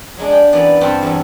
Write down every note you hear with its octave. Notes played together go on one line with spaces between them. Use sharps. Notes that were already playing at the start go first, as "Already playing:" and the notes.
F#3 G#3 D4
G4 G5
F#2 E3 B3 D5
G2 C4 G4 F#5 G5 A5
E2 F#3